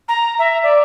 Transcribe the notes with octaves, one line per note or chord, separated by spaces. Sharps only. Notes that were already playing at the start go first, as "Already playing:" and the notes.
A#5
E5
D5